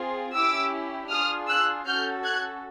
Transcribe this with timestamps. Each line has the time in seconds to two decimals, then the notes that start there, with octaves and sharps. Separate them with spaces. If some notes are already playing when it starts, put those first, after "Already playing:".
Already playing: C4 F4 G#4
0.35 C#4 E4 G4 D6 E6
1.10 D4 F4 G#4 D#6 F6
1.48 E6 F#6
1.86 C#4 F#4 A4 F6 G6
2.23 F#6 G#6